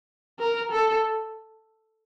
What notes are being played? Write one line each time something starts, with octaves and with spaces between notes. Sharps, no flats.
A#4
A4